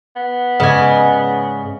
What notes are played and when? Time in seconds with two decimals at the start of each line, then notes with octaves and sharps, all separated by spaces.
0.16 B3
0.60 G#2 C#3 D5 D#5 G#5